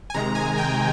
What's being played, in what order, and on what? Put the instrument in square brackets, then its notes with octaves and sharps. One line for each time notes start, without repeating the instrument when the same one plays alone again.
[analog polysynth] G#5
C3 D#3 G#3 A#5
G#5
G5